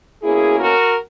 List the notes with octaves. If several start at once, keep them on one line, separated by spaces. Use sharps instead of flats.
B2 A#3 C#4 E4 G#4
F#4 A#4